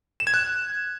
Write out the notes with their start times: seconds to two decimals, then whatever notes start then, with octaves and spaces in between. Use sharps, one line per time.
0.20 E7
0.27 G#6
0.34 F#6